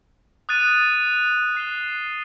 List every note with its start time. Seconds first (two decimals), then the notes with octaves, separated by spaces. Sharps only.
0.49 D#6 F#6 A6 D#7
1.55 F#6 C7 E7 G7